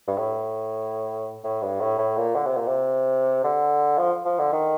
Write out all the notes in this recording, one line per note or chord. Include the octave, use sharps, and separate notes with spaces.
G2
A2
A2
G2
A2
A2
A#2
D3
C3
A#2
C3
D3
F3
F3
D3
D#3